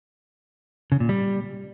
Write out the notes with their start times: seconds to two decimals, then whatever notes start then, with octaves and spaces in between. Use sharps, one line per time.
0.92 C#3
1.00 A#2
1.09 G3